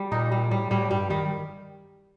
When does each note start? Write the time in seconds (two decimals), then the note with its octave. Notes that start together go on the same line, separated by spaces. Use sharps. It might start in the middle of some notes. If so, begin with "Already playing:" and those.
Already playing: G3
0.12 A#2 D#4
0.31 G3
0.51 A2 G3
0.71 A2 G3
0.91 G2 G3
1.10 D#3 G3